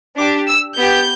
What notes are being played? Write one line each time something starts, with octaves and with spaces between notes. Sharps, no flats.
D4 G4 D6
E6
B3 G4 G6